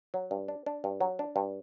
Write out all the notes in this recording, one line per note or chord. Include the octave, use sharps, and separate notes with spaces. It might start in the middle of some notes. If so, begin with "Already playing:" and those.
F#3
G2
D4
D4
G2
F#3
D4
G2